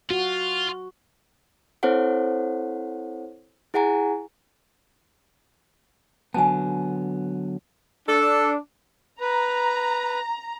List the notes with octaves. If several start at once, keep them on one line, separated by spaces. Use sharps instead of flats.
F4 F#4
C4 E4 A4 C5 C#5 F#5
E4 G#4 F#5 G#5 A#5
D3 F#3 B3 G#5 A5
D4 A4
B4 A#5